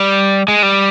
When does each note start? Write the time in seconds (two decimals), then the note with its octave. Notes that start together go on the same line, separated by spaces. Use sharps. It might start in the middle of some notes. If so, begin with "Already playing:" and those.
Already playing: G3
0.48 G#3
0.63 G3